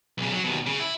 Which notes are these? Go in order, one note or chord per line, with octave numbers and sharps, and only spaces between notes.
B1 C#3
F#3
D#2 B2
C#3
E4